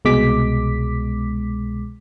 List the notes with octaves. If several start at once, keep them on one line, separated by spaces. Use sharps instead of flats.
C2 B2 G#3 D6 B6